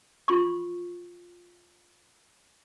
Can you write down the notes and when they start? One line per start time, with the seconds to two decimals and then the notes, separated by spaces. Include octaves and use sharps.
0.28 F4 C6 C#6